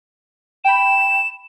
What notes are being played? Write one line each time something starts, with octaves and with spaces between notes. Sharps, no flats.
G5 B5 E7